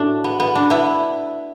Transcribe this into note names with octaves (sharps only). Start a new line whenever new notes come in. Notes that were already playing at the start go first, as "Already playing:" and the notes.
Already playing: A2 A3 D4 F#4
B3
B3
D4
B3 E4